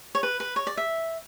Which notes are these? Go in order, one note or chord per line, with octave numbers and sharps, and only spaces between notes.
C#5
B4
B4
C#5
D5
E5